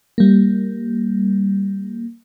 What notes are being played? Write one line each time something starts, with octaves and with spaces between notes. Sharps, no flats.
G3 A#3